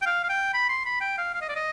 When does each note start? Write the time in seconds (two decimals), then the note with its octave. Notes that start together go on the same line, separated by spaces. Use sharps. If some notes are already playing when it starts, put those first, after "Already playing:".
0.02 G5
0.06 F5
0.24 F5
0.29 G5
0.54 B5
0.69 C6
0.86 B5
1.01 G5
1.18 F5
1.34 F5
1.42 D#5
1.49 D5
1.56 D#5